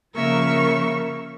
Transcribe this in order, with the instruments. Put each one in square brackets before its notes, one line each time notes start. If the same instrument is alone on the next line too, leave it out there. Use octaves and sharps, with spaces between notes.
[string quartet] C#3 F3 A#3 A#4 E5 C#6